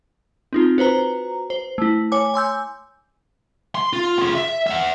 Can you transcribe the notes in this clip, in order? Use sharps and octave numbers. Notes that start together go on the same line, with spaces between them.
C4 D#4 F4
F#4 B4 C5 A#5
C5
A3 E4
C#5 G#5 D6
G#5 C6 E6 G6
C6
F4
F4 G#4
E5
E5 F#5